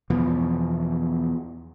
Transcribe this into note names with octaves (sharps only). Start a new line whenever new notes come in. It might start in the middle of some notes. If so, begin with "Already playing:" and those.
E2 B2 F3